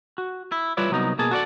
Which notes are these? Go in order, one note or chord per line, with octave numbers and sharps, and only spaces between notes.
F#4
E4
G3 E4 F4 B4 C#5 D5
C2 F#3 B3 D#4
B2 A#3 G#4 A5
F#4 A4 C#5 D5 F#5